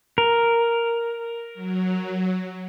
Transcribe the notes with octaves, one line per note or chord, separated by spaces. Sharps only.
A#4
F#3